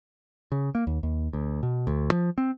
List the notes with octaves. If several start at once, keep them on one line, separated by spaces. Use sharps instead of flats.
C#3
A#3
D#2
D#2
D2
B2
D2
F3
C4